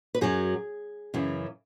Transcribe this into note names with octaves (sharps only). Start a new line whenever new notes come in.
B4
F#2 F#3 G#4
F#2 C#3 E3